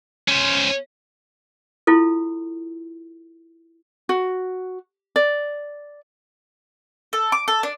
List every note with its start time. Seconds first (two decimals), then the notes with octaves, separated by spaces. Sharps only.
0.28 C#4 C5
1.87 E4 F4 A4
4.09 F#4
5.16 D5
7.13 A4
7.32 D6
7.48 A4
7.63 D4